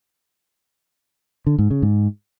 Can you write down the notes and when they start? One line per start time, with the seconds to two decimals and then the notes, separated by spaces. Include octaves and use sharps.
1.47 D3
1.59 G#2
1.70 C#3
1.82 G#2